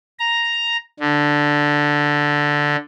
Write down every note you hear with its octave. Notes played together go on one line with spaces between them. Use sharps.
A#5
D3